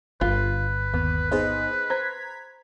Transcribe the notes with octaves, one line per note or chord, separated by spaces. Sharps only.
G1 F4 B4
D#2 B3
B3 D#4 G#4 C5 D#5
C5 A#5 G#6 B6